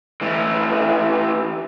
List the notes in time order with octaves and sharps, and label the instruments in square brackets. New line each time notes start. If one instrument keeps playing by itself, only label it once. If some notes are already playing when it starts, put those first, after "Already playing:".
[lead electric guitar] A2 E3